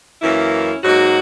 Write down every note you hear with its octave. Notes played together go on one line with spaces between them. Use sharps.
F#2 E3 A#3 C#4 E4
G#2 F#3 A#3 D#4 F#4